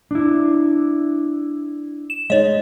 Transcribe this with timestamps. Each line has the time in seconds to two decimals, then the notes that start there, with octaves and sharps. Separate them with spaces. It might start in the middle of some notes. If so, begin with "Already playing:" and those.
0.11 D4 E4
2.10 E7
2.30 G#3 D#4 C#5 D#5